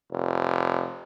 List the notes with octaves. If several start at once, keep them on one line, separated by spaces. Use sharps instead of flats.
F1